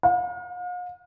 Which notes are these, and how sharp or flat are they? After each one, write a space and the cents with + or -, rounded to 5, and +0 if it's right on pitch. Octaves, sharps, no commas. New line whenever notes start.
F5 +45